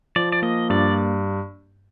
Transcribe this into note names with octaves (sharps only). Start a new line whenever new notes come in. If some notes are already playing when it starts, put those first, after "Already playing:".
F3 D5
D5
A#3 D#5
G2 D5